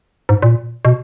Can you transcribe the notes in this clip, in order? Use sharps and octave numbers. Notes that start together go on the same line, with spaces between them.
G#2
A#2
B2